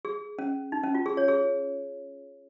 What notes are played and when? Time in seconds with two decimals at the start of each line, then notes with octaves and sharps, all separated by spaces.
0.05 G#4
0.39 C#4
0.72 D#4
0.83 C#4
0.95 F4
1.06 G#4
1.17 C#5
1.28 G#4